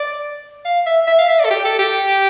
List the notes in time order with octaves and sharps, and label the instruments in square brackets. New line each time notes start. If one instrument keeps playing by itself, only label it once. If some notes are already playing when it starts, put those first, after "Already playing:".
Already playing: [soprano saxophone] D5
F5
E5
E5
F5
E5
D5
A4
G4
A4
G4